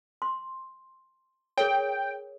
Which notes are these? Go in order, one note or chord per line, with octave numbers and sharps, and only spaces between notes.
C6
G#4 A#4 C#5 G5